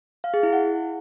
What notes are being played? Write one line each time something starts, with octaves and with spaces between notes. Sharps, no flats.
F5
G#4
E4
F#5